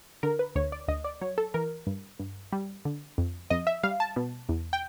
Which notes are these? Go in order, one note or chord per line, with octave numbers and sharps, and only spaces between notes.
D3 A#4
B4
D2 C#5
D5
D2 D#5
D5
F#3 C#5
A4
E3 A#4
G2
G2
G3
D3
F2
F2 D#5
E5
G3 F5
A5
B2
E2
G5